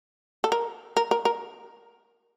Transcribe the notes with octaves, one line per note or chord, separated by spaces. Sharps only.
A4
A#4
A#4
A#4
A#4